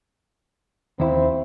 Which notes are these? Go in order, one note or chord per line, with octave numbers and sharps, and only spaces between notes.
D#2 C4 E4